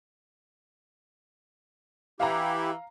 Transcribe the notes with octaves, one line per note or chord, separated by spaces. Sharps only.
E3 E4 G4 F5 A#5